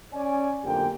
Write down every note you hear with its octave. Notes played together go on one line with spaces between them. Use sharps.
C#4 D5 G#5
B1 F2 D3 A#3 G4 G5